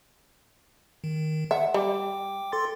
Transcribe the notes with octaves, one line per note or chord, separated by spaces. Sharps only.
D#3
E5 F#5
G3 G5 D6
A4 C6 A6